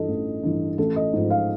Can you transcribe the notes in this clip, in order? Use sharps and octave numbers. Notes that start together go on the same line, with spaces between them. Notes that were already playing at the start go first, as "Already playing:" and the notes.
Already playing: G2 E3 A4 D#5
A1
G2 E3
A1 A4
D#5
G#2 F3
F5